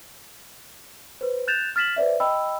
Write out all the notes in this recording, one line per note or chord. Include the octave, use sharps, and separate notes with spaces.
B4 C5
F#6 G6 A6 E7 F7
F6 A6 B6 E7 F#7
B4 C5 D5 E5
D#5 G5 B5 E6